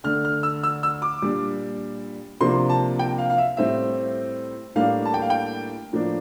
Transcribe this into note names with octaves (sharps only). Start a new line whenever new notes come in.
D3 A3 D4 F6
F6
E6
E6
E6
D6
A#2 G3 D4
C3 F3 A#3 D4 C6
A5
G5
F5
F5
E5
A2 G3 C4 E5
A2 G3 A#3 D4 F5
A5
G5
F5
G5
A2 F3 A#3 D4